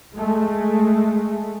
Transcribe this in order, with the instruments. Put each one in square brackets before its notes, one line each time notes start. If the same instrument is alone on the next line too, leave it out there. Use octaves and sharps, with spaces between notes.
[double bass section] G#3 A3